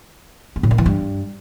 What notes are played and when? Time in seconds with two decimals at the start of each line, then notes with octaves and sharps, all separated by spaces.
0.56 B3
0.63 A2
0.71 A#3
0.78 E3
0.86 G2